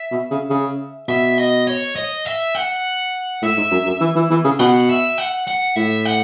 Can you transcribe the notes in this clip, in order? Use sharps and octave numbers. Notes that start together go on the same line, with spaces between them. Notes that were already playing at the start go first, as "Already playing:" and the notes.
Already playing: E5
B2
C#3
C#3
B2 E5
D#5
C#5
D#5
E5
F#5
A2 E5
G#2
F#2
F#2
E3
E3
E3
C#3
B2 F#5
E5
F#5
F#5
A2 E5
F#5